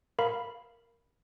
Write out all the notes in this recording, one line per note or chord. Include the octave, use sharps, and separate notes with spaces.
A#4 F5 B5